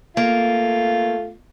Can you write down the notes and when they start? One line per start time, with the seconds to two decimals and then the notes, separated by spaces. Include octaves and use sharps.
0.17 A3 A#3 F4